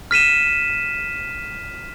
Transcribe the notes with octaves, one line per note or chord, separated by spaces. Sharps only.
F6 B6 D#7 E7